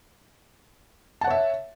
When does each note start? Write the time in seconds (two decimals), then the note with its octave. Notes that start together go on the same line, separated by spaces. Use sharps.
1.21 A5
1.24 F#5
1.27 C#5
1.30 E5